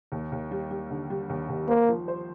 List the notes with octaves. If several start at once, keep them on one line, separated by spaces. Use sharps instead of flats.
D#2
D#2
G3
G3
D3
G3
D#2
D#2
A#3 C5
F3
C5